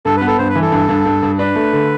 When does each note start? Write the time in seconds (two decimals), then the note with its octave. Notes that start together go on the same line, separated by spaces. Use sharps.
0.05 G2 A4
0.17 B3 B4
0.27 A4
0.38 G2 C5
0.50 B4
0.55 E3
0.61 A4
0.72 G2
0.89 G2
1.06 G2
1.23 G2
1.38 D4 B4
1.55 A3
1.73 D3